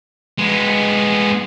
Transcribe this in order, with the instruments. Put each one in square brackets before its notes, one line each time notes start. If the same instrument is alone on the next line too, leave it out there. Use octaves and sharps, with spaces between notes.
[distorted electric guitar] G#3 B3